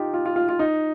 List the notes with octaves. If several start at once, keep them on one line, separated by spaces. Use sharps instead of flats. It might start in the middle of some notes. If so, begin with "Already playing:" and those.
Already playing: D#4 F4 G4
F4
F4
F4
F4
D#4